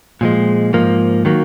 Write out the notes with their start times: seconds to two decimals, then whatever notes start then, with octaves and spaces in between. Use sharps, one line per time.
0.21 A#2 F3 G#3
0.73 G#2 F3 A#3
1.25 D#3 F#3 A#3